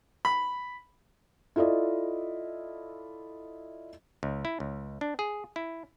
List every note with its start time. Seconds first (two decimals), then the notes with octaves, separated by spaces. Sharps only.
0.25 B5
1.56 E4 F4 A4 D5 D#5
4.23 C#2
4.45 E4
4.60 C#2
5.01 D4
5.19 G#4
5.56 E4